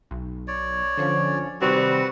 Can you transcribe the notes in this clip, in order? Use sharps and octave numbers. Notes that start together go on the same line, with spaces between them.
B1
C#5 D5
D3 F3 C#4
C3 D#3 G3 C4 F#4 B4 F#5